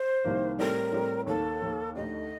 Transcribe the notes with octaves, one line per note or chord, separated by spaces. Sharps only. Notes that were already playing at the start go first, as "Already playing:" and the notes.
Already playing: C5
C2 C3 D#3 A#3
A2 G3 C4 G4 A#4
A2 G3 C4 G4
D#2 D#3 A#3 A4
D#2 D#3 A#3
D2 D3 A3 D#4 G4 D#5